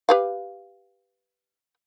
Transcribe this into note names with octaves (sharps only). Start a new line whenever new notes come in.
G4 B4 F5